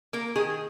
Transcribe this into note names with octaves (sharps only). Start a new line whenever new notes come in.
A#3 A#4
D#3 G#4